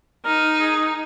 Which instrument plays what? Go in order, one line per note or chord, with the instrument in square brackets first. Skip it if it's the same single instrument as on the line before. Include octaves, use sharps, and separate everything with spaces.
[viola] D#4 [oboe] A#4
[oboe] G#4